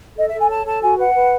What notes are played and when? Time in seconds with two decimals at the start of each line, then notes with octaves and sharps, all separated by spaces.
0.16 A4 D#5
0.28 E5
0.33 A4
0.38 G#5
0.49 C#5 A5
0.65 A4 A5
0.82 F#4 G#5
0.98 B4 F#5
1.14 B4